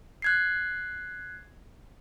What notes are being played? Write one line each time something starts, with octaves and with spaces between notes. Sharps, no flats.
F#6 G#6 C7